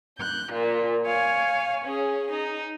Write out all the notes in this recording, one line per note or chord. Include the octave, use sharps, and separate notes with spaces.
F#6 G6
A#2 F4
C#5 F5 G#5
C#4 G#4
D#4